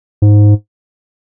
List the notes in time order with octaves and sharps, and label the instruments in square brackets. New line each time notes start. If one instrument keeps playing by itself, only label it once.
[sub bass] G#2